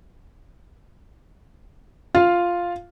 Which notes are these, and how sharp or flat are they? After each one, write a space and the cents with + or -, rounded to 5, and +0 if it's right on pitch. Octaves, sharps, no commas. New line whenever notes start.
F4 +0 F5 +0